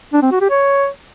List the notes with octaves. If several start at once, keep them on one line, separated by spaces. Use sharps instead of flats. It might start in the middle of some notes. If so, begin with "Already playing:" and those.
D4
C4
F#4
G4
C#5